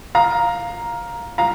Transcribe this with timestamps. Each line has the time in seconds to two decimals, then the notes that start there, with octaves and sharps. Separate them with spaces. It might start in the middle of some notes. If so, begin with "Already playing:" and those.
0.15 F5 A#5
1.38 F5 A#5